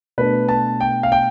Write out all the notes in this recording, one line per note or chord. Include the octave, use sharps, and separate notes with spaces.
B2 A3 D4 B4
A5
G5
F5
G5